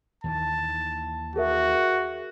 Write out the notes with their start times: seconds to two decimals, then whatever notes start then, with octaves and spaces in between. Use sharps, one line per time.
0.24 D#2 D#3 E3 A5
1.36 F#4 G#4 A#4 E5